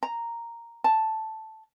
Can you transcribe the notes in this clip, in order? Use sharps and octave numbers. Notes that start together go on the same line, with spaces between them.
A#5
A5